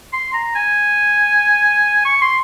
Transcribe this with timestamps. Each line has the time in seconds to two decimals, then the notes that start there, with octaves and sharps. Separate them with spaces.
0.13 C6
0.34 A#5
0.55 G#5
2.05 C#6
2.21 C6